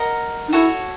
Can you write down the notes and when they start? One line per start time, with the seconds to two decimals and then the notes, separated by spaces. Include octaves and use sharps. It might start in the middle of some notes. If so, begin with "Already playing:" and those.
Already playing: A#4 D#5 F#5
0.48 D#4
0.52 E4 F#4 A4 C#5 F#5